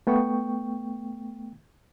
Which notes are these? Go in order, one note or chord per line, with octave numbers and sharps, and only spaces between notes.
A3 B3 G5 C#6